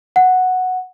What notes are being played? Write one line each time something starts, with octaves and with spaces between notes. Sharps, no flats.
F#5